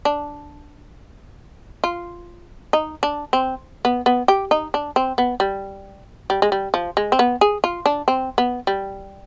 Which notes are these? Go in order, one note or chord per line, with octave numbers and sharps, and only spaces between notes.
D4
F4
D#4
D4
C4
B3
B3
G4
D#4
D4
C4
B3
G3
G3
G#3
G3
F3
G#3
C4
B3
G#4
F4
D4
C4
B3
G3